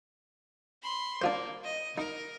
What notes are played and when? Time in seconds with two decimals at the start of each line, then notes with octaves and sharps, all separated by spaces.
0.82 B5 C6
1.22 A#3 D4 F4 C5
1.64 D#5
1.98 D#4 A#4